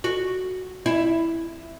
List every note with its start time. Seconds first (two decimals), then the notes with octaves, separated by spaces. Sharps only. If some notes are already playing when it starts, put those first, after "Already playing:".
0.04 F#4
0.86 E4